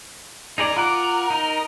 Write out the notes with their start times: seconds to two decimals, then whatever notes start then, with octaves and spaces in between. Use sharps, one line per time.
0.58 D#4 G#4 A#4 D5
0.77 F4 A#4 F#5 D6
1.30 D#4